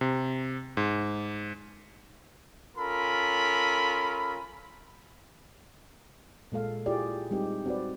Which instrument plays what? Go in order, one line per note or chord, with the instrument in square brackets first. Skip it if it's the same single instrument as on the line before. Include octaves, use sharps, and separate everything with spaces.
[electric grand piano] C3
G#2
[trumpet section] C#4 F4 A4 A#4 B5
[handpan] A#2 G#3 A4 F5
E4 F4 G4 G#4 D5
G3 G#3 C4 D#4 G4
C4 F#4 B4 D5